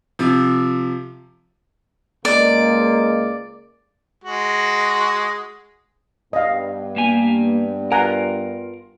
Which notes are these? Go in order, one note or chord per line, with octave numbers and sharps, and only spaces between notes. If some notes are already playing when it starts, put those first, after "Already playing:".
C3 F3
C#2 G#3 A#3 D5
G#3 F#4
G2 B3 D#5 F5
A#3 G4 G#5
F4 A#4 F#5 G#5 A#5